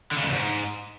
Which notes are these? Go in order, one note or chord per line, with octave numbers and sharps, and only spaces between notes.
D3
C#3
G#2
E2
G#2